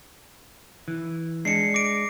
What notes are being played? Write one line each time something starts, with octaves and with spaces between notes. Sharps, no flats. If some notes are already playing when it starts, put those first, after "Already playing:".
E3
G#3 D4 C7 C#7
D6 A#6 D7